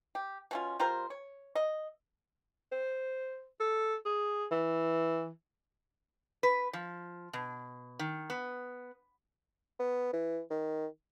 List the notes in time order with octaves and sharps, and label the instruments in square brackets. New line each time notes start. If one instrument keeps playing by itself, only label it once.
[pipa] G4
B2 C#4 F4
G3 F4 A#4 C5
C#5
D#5
[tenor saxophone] C5
A4
G#4
E3
[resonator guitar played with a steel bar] B4
F3
B2
D#3
B3
[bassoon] B3
E3
D#3